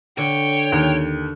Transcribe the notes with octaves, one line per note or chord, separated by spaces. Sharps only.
D3 C#5 G5
D#2